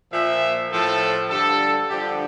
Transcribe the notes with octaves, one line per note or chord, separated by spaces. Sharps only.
A#2 F3 E5
A2 F3 A4
G2 D3 G3 A4
G2 D3 F3 G4